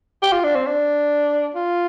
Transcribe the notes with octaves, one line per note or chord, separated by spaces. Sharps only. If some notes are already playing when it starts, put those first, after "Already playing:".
G4
F4
D4
C4
D4
F4